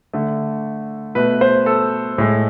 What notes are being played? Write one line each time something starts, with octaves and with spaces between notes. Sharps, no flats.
D3 A3
B2 A3 B4
C5
A4
A2 G#3